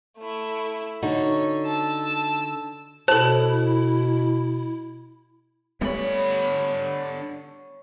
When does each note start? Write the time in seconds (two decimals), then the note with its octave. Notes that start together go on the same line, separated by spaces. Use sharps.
0.18 A3 E4
1.03 D3 D#4 F#4 C#5
1.66 A5 E6
3.08 B2 E4 A4 C5 A5
5.81 D3 G3 A3 B3 C#5 G#5 B5